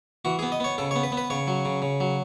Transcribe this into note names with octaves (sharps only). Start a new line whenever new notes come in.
E3 F#4
B3 G#4
D#5
B3 C#5
C#3 A4
C#5
B3
B4
B3
B4
C#3 C#5
F#3
C#3
C#3
F#3